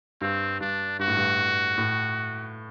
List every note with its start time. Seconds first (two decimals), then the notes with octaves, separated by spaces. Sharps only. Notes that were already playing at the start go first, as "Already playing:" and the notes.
0.21 G2 C4
0.61 G2 D4
0.99 G2 F#4
1.08 A2
1.17 G2
1.78 A2